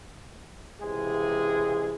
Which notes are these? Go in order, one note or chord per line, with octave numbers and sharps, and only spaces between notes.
C#2 C3 E3 G#3 G#4